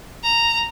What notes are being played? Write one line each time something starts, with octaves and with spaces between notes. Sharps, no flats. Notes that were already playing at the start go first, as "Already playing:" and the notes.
A#5